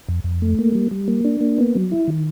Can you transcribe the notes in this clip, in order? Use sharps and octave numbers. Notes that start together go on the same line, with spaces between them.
F2
F2
A3
A#3
G3
G3
A#3
D4
A#3
B3
F#3
E4
D#3